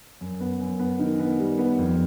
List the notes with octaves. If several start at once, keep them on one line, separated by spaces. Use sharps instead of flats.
F#2
B3
F#2
B3
D#3
B3
G3
B3
F2